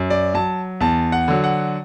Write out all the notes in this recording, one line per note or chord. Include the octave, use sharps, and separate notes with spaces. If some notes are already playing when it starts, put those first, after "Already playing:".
Already playing: F#2
D5
F#3 A5
E2 A5
F#5
D3 F#3
F#5